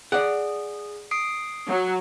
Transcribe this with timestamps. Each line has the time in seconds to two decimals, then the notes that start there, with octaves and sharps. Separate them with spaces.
0.12 G#4 D5 F#5
1.11 D#6 C7 D7
1.68 F#3